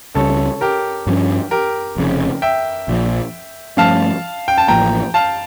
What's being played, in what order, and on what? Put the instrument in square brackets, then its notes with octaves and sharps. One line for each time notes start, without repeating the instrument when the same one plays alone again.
[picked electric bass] C#2 C#3 G3 [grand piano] A4 C#5
[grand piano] G4 A#4
[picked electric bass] G2 F3 C#4
[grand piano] G4 A#4
[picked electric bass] F1 F2 C#3
[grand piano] E5 G5
[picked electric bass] A#1 A#2 F3
[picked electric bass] G2 F3 A3 C#4 [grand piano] F5 A5
[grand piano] G5
A5
[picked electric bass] A1 A2 F3 A#3 [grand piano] G5 A#5
[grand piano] F5 A5